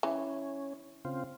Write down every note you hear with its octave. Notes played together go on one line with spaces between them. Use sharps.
E3 C#4
C#3 C4 F4